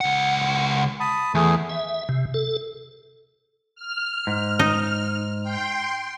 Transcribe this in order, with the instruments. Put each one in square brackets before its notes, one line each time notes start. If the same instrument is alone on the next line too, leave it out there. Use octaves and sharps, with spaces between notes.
[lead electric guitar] C#2 F#5
[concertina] A5 B5 D#6
[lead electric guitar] E2 [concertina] A3 G#4
[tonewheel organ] E5
C3
A4
[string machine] F6
[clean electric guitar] G#2
[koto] D#4
[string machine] G5 C6